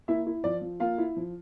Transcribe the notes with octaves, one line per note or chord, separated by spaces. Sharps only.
A#3 E4 E5
E4
F3 D5
F3
A#3 F4 F5
E4
F3